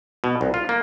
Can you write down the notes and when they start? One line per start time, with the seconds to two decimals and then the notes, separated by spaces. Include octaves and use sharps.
0.24 B2
0.41 C2
0.54 F4
0.69 A#3